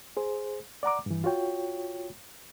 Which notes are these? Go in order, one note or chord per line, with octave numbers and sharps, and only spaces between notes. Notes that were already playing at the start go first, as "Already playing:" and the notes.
G#4 C5
D5 F#5 A#5 D6
G2 E3
F4 F#4 C#5 G5